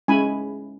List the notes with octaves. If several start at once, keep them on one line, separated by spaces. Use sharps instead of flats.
G#3 C#4 E4 G#5 B5